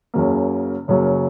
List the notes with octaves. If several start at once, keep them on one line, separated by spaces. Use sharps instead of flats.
F#1 F#2 C#3 F#3 A#3
F#1 F#2 C#3 F#3 A#3